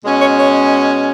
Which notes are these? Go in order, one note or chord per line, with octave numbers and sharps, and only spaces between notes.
B2 G#3 C#4
C#5
C#5